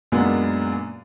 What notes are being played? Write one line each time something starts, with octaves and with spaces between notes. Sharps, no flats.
F#2 A#2 G#3 A#3 B3 D4